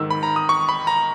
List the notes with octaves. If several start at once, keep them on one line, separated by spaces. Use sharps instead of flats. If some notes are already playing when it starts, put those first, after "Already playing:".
Already playing: G#2 D#3 E6
B5
A#5
D#6
C#6
B5
A#5